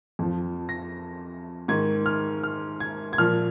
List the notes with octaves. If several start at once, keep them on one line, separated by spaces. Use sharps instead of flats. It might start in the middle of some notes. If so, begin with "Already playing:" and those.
F2 F3
A#6
G#2 D#3 G#6
F6
F6
G#6
G#6
A#2 F3 F6